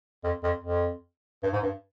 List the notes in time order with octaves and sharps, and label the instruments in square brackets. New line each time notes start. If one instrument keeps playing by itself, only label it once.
[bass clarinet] F2
F2
F2
G2
G#2
G2